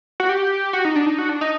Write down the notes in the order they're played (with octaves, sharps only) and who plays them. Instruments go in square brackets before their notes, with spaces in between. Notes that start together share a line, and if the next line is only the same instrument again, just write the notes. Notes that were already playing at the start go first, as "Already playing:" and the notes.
[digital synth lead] F#4
G4
F#4
D#4
D4
D#4
F#4
D4
D#4